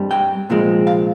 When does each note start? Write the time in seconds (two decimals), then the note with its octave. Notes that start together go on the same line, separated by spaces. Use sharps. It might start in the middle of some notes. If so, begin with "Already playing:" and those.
Already playing: G2 G3 C4
0.11 G5
0.49 C2 A#2 F3 G#3 C4
0.87 F5